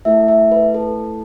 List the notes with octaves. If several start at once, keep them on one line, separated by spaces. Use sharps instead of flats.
A3 E4 A4 E5
E5
B4
A4